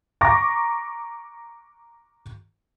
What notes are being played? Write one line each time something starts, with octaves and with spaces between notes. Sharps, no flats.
A#5 C#6 D6 A#6